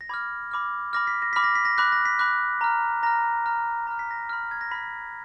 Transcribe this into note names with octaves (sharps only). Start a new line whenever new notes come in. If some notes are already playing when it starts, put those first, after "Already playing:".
A#6
B5 D6 F6 G#6
B5 D6 F6
B5 D6 F6 A#6
B6
A#6
B5 D6 F6 B6
A#6
B6
A#6
B5 D6 F#6 B6
A#6
B6
B5 D6 F#6
A#5 F6
A#5 F6 A#6
A#5 F6
A#5 F6 A#6
B6
A#6
B5 F6
G#6
A#6
B5 F6 B6